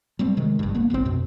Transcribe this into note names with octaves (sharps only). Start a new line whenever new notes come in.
G3 A3 C4
C3 D#3 G#3
F1 G2
F#1 A#3 B3
G1 C2 D3 C4
F2 B2